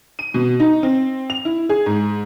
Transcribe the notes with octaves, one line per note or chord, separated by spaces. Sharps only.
D#7
B2
D#4
C4
F7
E4
G#4
G#2